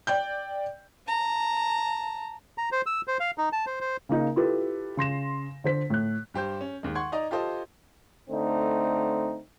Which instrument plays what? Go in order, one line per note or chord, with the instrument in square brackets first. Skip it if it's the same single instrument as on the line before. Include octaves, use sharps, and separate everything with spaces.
[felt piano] D5 G5 G6
[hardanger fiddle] A5 A#5
[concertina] A#5
C5
E6
C5
F5
D#4
A5
C5
C5
[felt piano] C#3 A#3 D#4
E4 F4 G4 A4 B4
C#3 C6 A#6 E7
D3 C5 B6
A2 F#6
[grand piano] G2 G4 C5 G6
C#4
D#2 G#3
F#5 C6 C#6 G#6
D#4 D5 D#5 A#5
F4 G4 A4 C5 D#5
[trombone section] D3 A3 C4 D#4